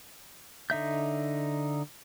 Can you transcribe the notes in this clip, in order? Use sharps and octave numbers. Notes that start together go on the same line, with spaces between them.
D3 D#4 E5 G6